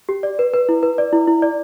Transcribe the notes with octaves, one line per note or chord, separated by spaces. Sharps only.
G4
D5
B4
B4
E4
B4
D5
E4
E4
D5